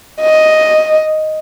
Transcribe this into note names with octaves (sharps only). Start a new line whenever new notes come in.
D#5